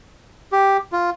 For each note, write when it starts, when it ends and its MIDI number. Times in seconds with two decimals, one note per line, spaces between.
0.52 0.77 67
0.92 1.10 65